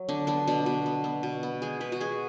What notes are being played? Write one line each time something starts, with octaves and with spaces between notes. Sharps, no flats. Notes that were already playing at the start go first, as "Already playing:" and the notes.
Already playing: F#3
D3 D4
B3 D4
B2 D4
B2
B3
B3
B2
B3
G#3 G#4
G#3 B4
F#4
G#3 G#4